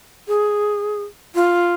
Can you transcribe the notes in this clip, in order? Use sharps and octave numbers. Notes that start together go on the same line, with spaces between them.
G#4
F4